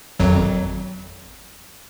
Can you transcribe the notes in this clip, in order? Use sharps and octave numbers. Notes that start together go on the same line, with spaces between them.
G#1 F2 F#3